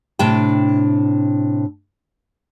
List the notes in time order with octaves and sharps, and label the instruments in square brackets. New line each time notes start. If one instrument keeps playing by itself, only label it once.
[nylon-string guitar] A2 C3 D4 G5 A5